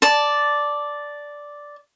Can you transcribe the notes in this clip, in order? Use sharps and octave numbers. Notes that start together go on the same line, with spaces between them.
D5 A5